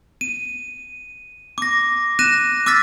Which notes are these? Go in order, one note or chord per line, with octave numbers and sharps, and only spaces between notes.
D#7
D6 A#6
F#6 A#6 D#7 E7
D6 E6 F6 A6 B6